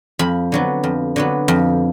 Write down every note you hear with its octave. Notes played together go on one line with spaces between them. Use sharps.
F2 B5
D3 F#3 B3
F2
D3 F#3 B3
F2